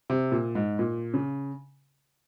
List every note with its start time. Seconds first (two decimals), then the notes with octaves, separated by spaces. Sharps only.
0.10 C3
0.32 A#2
0.55 G#2
0.79 A#2
1.14 C#3